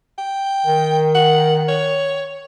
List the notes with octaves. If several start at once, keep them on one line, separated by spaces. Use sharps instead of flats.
G5
D#3
F#5
C#5